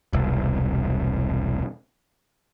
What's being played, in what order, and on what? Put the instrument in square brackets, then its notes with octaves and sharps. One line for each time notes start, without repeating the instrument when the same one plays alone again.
[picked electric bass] E1 C2